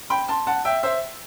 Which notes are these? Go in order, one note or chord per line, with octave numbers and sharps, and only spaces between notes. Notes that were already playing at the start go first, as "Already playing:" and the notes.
G5 B5
A5 C6
F#5 A5
E5 G5
C5 E5